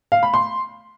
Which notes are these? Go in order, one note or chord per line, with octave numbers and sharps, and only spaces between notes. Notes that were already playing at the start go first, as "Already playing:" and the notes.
F5
B5
C6